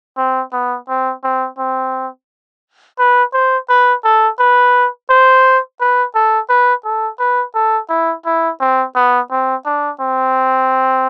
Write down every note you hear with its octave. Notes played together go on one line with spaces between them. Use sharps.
C4
B3
C4
C4
C4
B4
C5
B4
A4
B4
C5
B4
A4
B4
A4
B4
A4
E4
E4
C4
B3
C4
D4
C4